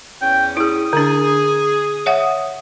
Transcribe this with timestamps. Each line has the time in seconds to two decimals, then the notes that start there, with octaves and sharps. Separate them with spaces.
0.22 E2 C#4 G5
0.57 E4 G#4 D#6
0.93 D3 D4 G#4
2.06 C#5 E5 F#5